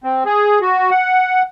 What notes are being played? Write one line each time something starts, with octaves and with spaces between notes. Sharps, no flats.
C4
G#4
F#4
F#5